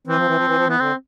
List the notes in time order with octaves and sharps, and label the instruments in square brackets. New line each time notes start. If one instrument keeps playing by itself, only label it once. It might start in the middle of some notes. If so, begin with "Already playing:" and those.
[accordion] E3 [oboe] C4
[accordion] F3
E3
F3
E3
F3
[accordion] E3 [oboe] B3
[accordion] D3 [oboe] C4